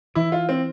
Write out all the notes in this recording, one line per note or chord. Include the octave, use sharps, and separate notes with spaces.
E3 E4
F4
C4